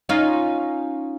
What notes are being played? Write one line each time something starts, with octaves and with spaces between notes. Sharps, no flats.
C#4 D#4 F4